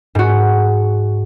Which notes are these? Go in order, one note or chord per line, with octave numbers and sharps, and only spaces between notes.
G#2 F#4